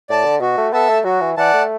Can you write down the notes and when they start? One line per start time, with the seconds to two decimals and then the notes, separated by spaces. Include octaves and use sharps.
0.09 A2 D5 A5
0.25 D3
0.41 B2 F#4
0.58 A3
0.73 B3 A4 E5 A5
0.90 A3
1.04 F#3 F#4
1.21 E3
1.37 E3 D5 F#5 A5
1.53 A3